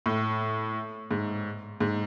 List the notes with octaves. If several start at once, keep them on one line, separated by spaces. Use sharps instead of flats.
A2
G#2
G#2